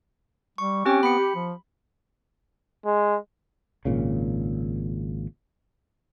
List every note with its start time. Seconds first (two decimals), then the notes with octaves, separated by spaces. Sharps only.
0.58 G3 C#6
0.86 C4 C#4 G4 G5
1.03 B3 B5 C#7
1.18 G4
1.35 F3
2.86 G#3
3.85 G#1 A#2 C#3